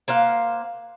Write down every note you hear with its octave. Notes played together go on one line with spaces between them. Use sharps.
A#3 C5 F5 F#5